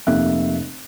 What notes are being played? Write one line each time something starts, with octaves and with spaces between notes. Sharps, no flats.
F1 C3 A#3 E5 F#6